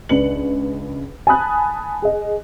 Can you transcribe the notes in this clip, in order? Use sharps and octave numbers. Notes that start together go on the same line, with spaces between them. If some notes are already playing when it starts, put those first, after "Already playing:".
C#2 D4 B4 C#7 F#7
G#5 A5 B5 D#6 F#6
G#4 D#5